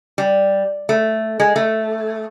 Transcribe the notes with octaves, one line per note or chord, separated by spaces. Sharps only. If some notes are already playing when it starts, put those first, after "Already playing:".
G3
A3
G#3
A3